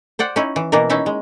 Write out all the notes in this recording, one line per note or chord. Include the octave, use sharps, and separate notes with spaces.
C5 D5 F#5 G5
C#4 D#4 E4
E3
B2 E3 A#3 E4 A#4
C#4 D#4 E4 E5
G#3